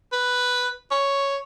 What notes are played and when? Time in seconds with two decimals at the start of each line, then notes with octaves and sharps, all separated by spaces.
0.12 B4
0.91 C#5